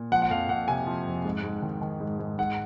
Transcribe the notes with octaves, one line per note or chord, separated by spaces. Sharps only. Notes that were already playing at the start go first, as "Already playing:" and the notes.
Already playing: A#2
F3 F#5
F#5
F2 F5
F2 F#5
C3 G#5
F3
F2
G#2
G#2
D#3
D#3
G#2
G#2
G#2 F#5